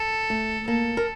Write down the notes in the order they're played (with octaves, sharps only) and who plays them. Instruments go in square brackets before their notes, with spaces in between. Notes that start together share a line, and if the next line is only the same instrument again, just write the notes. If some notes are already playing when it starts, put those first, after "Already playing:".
Already playing: [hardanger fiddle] A4
[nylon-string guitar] A3
[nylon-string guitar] A#3 [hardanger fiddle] A4
[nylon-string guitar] A#4